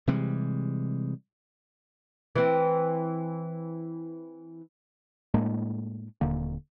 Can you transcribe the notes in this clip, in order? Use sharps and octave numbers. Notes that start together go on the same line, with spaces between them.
C3 E3 G3 G#3
E3 C4
A2 G#3 A#3 D4
D#1 D3 A#3